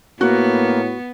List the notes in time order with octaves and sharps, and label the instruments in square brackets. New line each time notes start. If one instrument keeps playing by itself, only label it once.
[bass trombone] A2 [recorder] A#3 [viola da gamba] B3 [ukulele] F#4